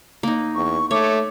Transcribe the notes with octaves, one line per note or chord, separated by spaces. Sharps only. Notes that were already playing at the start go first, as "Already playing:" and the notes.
A#3 D#4
E2 C#6
A3 C#5 D6